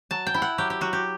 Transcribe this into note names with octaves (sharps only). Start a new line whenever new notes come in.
F#3 A5
G5
E4
F#5
F#3 G4
G4
F#3 F#4
G4